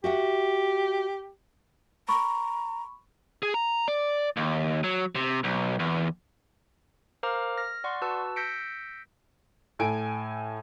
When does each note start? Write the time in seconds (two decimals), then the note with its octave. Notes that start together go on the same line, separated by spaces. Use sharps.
0.04 F#4 G4 E5 F#5
2.09 A#5 B5 C#6
3.43 G#4
3.54 A#5
3.88 D5
4.37 D#2
4.84 F#3
5.15 C3
5.44 B1
5.79 E2
7.23 A#4 C5 F5 A#5 D6 F6
7.57 F6 A#6
7.84 D5 F#5 C6 C#6
8.02 F#4 B4 A5 E6
8.36 E6 G6 A#6 B6 C#7 D7
9.79 A2 A4 G#5 D7